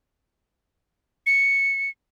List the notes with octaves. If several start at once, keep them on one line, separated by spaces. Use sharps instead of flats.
C#7